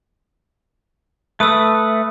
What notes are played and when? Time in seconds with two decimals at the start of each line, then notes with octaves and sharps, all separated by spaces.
1.40 A3 B4 D#6 E6